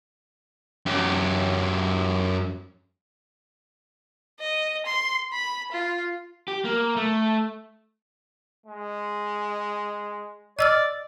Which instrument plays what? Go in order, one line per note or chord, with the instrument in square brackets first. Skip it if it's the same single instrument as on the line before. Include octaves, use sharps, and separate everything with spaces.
[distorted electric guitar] F#2 G4
[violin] D#5
C6
B5
F4
[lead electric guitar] G4
A#3
A3
[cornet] G#3
[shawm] D5 [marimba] D#5 E6 F6